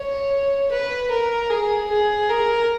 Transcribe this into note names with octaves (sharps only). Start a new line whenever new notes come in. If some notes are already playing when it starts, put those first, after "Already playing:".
Already playing: C#5
B4
A#4
G#4
G#4
A#4